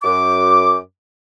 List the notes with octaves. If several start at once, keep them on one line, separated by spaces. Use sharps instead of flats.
F#2 D6